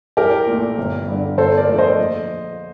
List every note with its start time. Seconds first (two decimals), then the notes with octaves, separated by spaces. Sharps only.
0.17 C2 G4 A#4
0.47 A#2 A3
0.78 G1
1.08 G2 D3
1.37 G1 A4 C5
1.58 A#4 D5
1.68 F2 D3 A3
1.78 C5 D#5
1.98 A#1